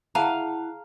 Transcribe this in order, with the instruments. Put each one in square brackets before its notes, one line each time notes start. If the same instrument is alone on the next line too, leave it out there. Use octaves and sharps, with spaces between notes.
[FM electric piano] E4 F#5 [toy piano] G#4 A5 A#5 [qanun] F5